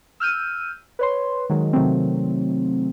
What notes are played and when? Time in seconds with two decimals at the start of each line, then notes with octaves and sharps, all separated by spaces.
0.20 E6 F6 G6 D#7
0.99 B4 C#5 C6
1.50 D#3 F#3 G#3
1.73 C3 D#3 F#3 A3 C4